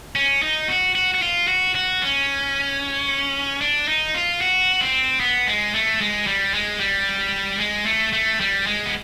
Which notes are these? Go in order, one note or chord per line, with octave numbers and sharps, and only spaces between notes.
C#4
D#4
F#4
F#4
F#4
F4
F#4
F#4
C#4
D4
D#4
F4
F#4
C4
B3
G#3
A3
G#3
G3
G#3
G3
G#3
A3
A3
G3
G#3
B3